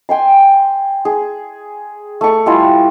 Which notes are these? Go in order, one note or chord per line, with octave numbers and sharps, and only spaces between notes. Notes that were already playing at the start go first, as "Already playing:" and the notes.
G5 G#5 C6
G#4
A3 C#6
G3 E4 F4 G#5